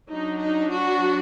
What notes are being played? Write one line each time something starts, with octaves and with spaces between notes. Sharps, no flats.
F#3 D4 D#4
D#4
F#4